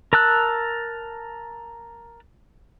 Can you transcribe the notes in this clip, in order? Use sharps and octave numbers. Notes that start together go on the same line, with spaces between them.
A#4 A5 E6 F#6